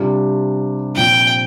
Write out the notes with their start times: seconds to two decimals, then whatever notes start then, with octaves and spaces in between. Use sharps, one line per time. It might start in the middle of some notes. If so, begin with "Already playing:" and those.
Already playing: C3 G3 D4 F4
0.96 A#2 F3 C4 G5